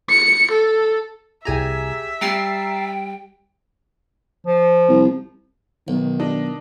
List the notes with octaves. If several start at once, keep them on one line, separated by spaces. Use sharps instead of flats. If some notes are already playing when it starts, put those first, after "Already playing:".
C#7
A4
C2 G4 G#4 E5 G5 G#5 A#5
G3 G5 A#5 A6 C7
F3
C2
B1 D#3
D4 D#4